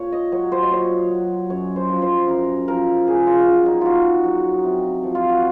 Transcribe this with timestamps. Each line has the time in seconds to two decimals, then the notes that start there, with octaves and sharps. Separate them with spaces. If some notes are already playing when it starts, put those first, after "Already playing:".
Already playing: A#2 C#5
0.12 D#5
0.32 F#3 C#5
0.52 C5
0.63 D#5
0.71 A#2 C#5
1.10 F#3
1.49 F#2 C#5
1.76 C5
1.89 F3
2.02 C5
2.28 F#2 A#4
2.68 F3 A#4
3.07 A#2 G#4
3.27 F4
3.46 F#3
3.66 D#4
3.81 A#2 F4 F#4
4.24 F#3
4.64 C3
5.03 F3
5.15 F4
5.29 F#4